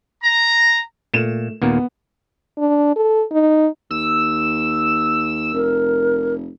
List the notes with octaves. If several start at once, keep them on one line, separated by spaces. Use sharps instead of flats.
A#5
A#2 A3 E7
D#2 A#2 A#3 B3
D4
A4
D#4
D#2 E6
F1 A#4